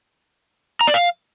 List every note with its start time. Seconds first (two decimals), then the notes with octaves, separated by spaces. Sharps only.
0.81 A#5
0.87 D5
0.94 F5